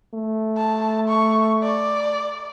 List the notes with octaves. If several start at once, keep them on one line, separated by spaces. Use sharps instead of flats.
A3
A5
C#6
D5